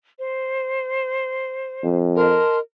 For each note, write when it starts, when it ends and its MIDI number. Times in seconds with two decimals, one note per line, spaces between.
0.18 1.96 72
1.84 2.41 41
2.16 2.59 70
2.16 2.58 75
2.16 2.58 81
2.16 2.58 84